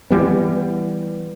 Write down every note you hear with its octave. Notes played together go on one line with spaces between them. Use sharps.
E3 G3 B3